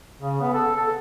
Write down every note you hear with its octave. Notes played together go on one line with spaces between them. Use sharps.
C#3
B3
A4
A4